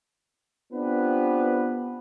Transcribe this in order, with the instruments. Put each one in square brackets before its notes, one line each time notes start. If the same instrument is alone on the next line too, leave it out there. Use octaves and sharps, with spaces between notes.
[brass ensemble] B3 C4 D4 F4 G4 B4